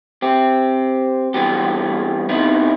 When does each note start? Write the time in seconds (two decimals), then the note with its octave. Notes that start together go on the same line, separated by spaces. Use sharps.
0.22 C4 G4
1.34 G2 E3 B3 F#4 G4
2.29 C3 B3 D#4 E4